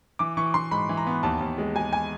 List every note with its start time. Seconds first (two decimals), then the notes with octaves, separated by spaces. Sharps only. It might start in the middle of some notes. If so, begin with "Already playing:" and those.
0.19 E3 D6
0.37 E3 C#6
0.54 E3 C6
0.71 G#2 B5
0.89 E3
0.97 A#5
1.07 B3
1.23 D#2 A5
1.41 D#2
1.58 G#3
1.76 G#3 G#5
1.92 G#5